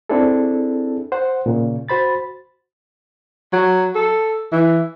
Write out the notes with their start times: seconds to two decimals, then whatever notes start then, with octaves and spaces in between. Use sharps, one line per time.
0.09 C4 D4 E4 G#4 A4
1.12 C5 F#5
1.46 A#2 C#3
1.89 F#4 C5 B5 A6
3.53 F#3
3.96 A4
4.52 E3